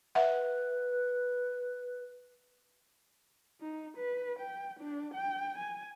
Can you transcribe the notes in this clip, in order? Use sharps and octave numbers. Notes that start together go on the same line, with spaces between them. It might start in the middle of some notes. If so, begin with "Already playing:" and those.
B4 E5 F#5
D#4
B4
G5
D4
G5
G#5